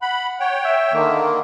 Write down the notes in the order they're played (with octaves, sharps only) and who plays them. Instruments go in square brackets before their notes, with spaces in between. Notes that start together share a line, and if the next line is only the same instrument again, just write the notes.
[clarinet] F#5 [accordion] B5
[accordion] C#5 G5 [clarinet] F#5
[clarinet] E5
[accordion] D3 D#3 A#3